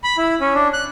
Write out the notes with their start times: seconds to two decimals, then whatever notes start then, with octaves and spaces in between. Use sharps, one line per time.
0.04 B5
0.17 E4
0.41 C#4
0.54 D4
0.73 F#6